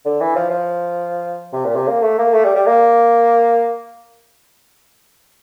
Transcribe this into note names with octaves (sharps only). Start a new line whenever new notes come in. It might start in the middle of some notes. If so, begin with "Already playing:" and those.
D3
E3
F3
F3
C3
A#2
C3
A#3
A3
A#3
A3
G3
G3
A#3